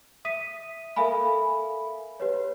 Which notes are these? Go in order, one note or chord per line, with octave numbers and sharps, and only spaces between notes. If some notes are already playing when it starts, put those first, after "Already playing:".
E5 D#6 B6 D#7
A4 A#4 E5 F5 G#5 B5
G4 B4 C#5